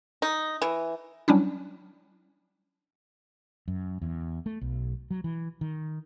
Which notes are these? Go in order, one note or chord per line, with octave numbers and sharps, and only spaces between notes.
D#4
E3
F#3 G3 C#4 D4 E4
F#2
E2
A3
B1
F#3
E3
D#3